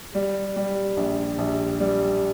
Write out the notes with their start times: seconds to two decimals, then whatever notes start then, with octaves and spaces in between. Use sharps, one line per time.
0.14 G3 G4
0.56 G3
0.97 A#1
1.38 A#1
1.80 G3 G4